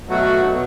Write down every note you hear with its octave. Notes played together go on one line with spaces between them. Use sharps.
B2 F#3 A3 F#4
B2 F#3